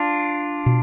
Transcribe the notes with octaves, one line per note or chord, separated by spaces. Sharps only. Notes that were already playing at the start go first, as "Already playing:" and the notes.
Already playing: D4 F4
B2